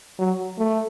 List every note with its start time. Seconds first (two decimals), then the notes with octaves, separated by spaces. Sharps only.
0.19 F#3
0.59 A3